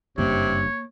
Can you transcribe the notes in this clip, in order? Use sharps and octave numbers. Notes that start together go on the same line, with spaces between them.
F#1 G2 C3 A#3 C#5